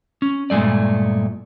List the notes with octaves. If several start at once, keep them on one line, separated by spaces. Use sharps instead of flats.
C#4
G2 A#2 G#3 A3 D5